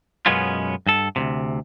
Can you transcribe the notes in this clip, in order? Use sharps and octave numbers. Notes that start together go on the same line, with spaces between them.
F#2 B2 G#3 B3 C#4 F4
G2 A4
D2 G#2 C3